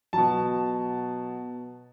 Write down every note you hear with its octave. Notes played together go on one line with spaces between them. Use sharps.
B2 F#3 A5